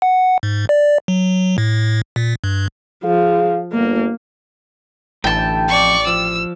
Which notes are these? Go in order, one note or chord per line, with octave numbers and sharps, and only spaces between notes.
F#5
G#2
D5
F#3
A2
A#2
G2
F3 G#4 F5
G1 A#3
A1 D3 E3 A3 G5 A5
F2 D5 C#6
F3 E6